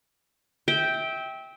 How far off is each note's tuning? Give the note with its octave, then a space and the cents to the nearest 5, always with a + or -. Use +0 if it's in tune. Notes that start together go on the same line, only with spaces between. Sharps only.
E5 -25 G5 +0